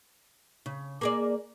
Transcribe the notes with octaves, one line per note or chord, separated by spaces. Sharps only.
C#3
A#3 G#4 D5